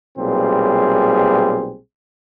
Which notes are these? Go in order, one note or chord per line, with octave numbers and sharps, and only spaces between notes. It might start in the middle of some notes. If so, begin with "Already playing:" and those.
B1 A#2 G3 C4 G#4